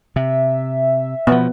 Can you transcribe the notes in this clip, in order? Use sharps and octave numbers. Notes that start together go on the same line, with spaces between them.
C3 E5
B2 F3 B3